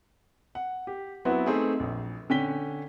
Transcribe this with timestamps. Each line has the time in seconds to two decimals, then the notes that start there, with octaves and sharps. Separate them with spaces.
0.55 F#5
0.87 G4
1.25 F#3 B3 C4 E4 F#4 B4
1.46 A3 C4 D#4 G#4
1.80 A#1
2.30 D3 C#4 G5 B6 G7